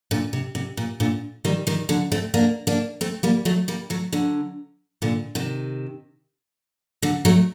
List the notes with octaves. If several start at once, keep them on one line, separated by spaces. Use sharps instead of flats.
A#2 D3
C3
C3
A#2
A#2 D3
D#3 G3
D#3 G3
D3 F#3
A3 C4
A#3 D4
A#3 D4
A3 C4
G3 A#3
F#3 A3
G3 A#3
F#3 A3
D3 F#3
A#2 D3
C3 D#3
D3 F#3
F#3 A3